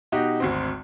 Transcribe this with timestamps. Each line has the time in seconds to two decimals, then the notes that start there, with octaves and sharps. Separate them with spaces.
0.12 B2 D#4 F#4 G4
0.40 G#1 D2 C4